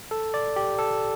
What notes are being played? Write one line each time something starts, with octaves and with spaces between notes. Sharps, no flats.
A4
D5
G4
A4